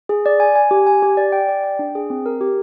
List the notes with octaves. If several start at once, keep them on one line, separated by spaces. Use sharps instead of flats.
G#4
D5
G#5
G#5
G4
G#5
G4
D5
G5
D5
G5
D4
G#4
C4
A#4
G4